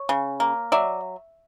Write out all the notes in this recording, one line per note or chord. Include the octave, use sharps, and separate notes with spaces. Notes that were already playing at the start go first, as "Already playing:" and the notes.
Already playing: C#5
C#3
A#3
F#3 D5 E5